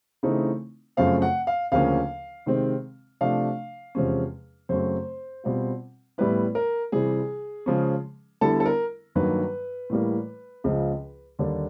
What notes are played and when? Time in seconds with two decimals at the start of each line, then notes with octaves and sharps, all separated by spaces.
0.23 C#3 E3 A3 C4 D#4
0.97 F#2 C#3 F3 A3 C4 F5
1.22 F#5
1.47 F5
1.72 D2 C#3 F3 A#3 C#4 F5
2.46 C3 D#3 G#3 C4
3.21 C3 F3 A3 D4 F5
3.95 E2 C3 F3 G#3 C#4
4.69 F#2 C#3 F#3 A3 C4 C5
5.44 B2 G3 C4 F4
6.18 A2 E3 G3 B3 E4 B4
6.55 A#4
6.92 C3 E3 G3 G#4
7.66 C#3 F3 G#3 C#4
8.41 D3 G3 B3 E4 A4
8.60 A4
8.66 A#4
9.15 G2 D#3 F#3 A#3 B4
9.90 A2 E3 G3 A#3
10.64 C#2 C#3 F3
11.39 D#2 D3 G3 A#3 D4